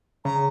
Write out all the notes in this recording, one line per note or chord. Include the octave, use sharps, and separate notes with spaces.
C#3 A#5